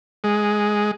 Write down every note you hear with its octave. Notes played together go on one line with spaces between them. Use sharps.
G#3